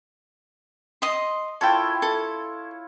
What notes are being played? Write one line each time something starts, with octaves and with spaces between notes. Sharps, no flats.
D#5 C6
E4 F4 A4 C#5 G5
A4